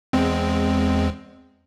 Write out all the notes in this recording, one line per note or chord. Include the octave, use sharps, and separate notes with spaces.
E2 G#3 C4